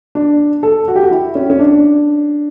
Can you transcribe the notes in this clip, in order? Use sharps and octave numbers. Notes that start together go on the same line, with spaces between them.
D4
A4
F#4
G4
F#4
E4
C#4
C#4
D4